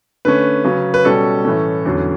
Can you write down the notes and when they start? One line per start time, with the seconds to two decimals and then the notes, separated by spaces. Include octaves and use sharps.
0.25 D3 A3 C#4 B4
0.64 C#3 F#3 C#4
0.94 B4
1.05 B2 G3 C#4 A4
1.45 A2 E3 A3 C#4
1.86 E2 D3 F#3 C#4